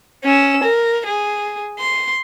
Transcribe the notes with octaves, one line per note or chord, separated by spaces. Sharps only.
C#4 E6
A#4
G#4
C6